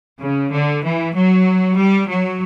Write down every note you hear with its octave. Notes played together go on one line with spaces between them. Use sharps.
C#3
D3
E3
F#3
G3
F#3